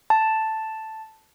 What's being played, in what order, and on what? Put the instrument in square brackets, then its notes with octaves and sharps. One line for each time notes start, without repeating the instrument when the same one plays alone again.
[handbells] A5